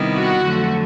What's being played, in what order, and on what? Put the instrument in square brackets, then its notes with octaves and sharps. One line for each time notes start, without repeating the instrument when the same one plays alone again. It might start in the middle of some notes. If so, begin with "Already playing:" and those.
Already playing: [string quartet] C3 D#3 G3 B3 E4
[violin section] F#4
[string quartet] F2 D3 F#3 A3